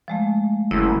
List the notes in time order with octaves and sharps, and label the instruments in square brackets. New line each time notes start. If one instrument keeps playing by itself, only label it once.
[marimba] F3 G#3 A3
[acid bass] F#1 [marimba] G#2 E4